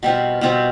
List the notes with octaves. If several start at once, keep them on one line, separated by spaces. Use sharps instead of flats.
B2 G3 C4 F4
B2 G3 C4 F4